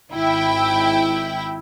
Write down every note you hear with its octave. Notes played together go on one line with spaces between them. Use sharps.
G#1 E4 G5